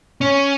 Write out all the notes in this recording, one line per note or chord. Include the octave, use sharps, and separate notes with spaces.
C#4